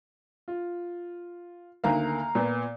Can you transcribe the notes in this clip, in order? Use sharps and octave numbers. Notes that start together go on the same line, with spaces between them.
F4
D2 D#3 A#3 F5 A#5
A#2 B3